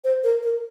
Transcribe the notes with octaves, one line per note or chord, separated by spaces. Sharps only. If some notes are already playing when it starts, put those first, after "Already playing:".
C5
A#4
A#4